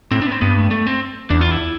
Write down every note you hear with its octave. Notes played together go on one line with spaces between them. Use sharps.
A2 C4
D4
B3
C4
G2 B3
A3
A3
C4
E2 D4
F4
E4